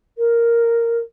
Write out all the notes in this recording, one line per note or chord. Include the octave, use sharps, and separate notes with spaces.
A#4